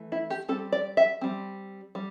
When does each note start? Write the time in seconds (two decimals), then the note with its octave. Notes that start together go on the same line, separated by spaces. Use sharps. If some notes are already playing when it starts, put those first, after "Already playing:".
Already playing: E3 A3
0.12 E4
0.30 G4
0.48 G3 C4 A4
0.72 D5
0.97 E5
1.21 G3 C4
1.95 G3